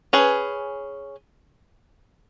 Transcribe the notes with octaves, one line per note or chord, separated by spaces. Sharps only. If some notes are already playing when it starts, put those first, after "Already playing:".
C#4 G#4 B4